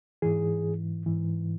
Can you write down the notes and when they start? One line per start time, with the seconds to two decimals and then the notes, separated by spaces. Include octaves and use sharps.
0.22 G#2 E3 G#4
1.06 G#2 E3